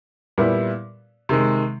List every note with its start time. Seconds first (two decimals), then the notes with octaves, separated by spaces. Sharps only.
0.38 A#2 G3 B3 E4
1.29 C3 D#3 G#3